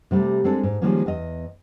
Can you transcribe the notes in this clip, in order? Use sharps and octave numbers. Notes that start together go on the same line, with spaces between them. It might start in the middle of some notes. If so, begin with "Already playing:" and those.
C3 G3 A3
G#3 C4 D4 A4
G#2
D#3 F3 G3 G#3 A#3 C#4
E2 D#5